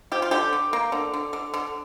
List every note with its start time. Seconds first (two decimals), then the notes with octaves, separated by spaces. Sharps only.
0.12 F3 G4
0.22 F4
0.31 D3 G4
0.53 D3
0.73 A#3
0.92 D3
1.14 D3
1.33 D3
1.54 D3